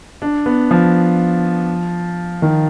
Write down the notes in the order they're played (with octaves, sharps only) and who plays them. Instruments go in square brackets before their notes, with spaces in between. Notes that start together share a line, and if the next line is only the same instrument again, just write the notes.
[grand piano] D4
B3
F3
D#3